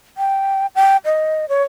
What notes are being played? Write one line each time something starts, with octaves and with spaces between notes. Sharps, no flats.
G5
G5
D#5
C#5